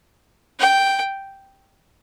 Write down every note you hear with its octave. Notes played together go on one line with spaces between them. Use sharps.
G5